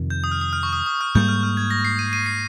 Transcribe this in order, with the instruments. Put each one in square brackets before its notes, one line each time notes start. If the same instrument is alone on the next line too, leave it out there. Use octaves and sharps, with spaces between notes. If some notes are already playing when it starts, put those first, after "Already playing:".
Already playing: [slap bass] F2 C3 D#3
[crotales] G6
D#6
F6
D#6
F6
C#6
D#6
D#6
F6
[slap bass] G#2 G3 A#3 [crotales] G6
[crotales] F6
F6
G#6
A#6
C7
D#7
D#7
C7